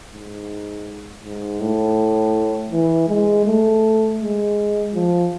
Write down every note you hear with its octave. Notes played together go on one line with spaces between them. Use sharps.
G#2
G#2
A2
E3
G#3
A3
G#3
F3